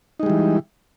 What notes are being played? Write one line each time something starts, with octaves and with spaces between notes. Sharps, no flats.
E3 G3 G#3 D#4